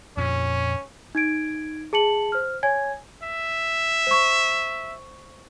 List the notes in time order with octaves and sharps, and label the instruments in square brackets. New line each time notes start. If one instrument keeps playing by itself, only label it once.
[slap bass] F2 A#2 [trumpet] C#4
[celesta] D#4 G#6 D7
G#4 A5 C#7 F#7
C5 F6
C#5 G#5 G#6
[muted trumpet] E5
[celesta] C5 C#6